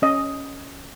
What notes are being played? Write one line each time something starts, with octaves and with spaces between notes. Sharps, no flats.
C#4 D#5